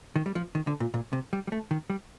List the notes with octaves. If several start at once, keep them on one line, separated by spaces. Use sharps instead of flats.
D#3
G3
F3
D#3
D3
A#2
A#2
C3
G3
G3
A3
D#3
G3